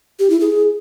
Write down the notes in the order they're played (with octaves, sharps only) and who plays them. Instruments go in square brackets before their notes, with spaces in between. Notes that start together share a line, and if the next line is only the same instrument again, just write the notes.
[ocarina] G4
E4
G#4